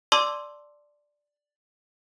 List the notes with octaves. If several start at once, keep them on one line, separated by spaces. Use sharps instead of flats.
D5 A5 C6 D6 E6